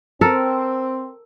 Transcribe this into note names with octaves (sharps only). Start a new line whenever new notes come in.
C4 A4 A#4